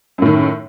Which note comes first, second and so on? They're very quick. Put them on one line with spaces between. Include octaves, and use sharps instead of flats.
F#2 A2 D#3